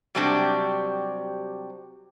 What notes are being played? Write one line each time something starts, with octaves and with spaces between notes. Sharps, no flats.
C3 F#3 G3 C4 D4 G4